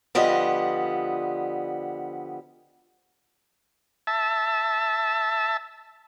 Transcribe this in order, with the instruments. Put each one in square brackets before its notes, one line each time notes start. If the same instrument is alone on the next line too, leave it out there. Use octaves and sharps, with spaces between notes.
[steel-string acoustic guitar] D3 F3 G3 B3 D#5
[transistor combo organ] E5 A5